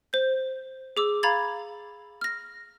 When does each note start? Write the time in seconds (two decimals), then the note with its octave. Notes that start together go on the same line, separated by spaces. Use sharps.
0.13 C5 G6
0.97 G#4 D6 E6
1.23 F5 A#5 B5 G#6 A6
2.21 F6 A#6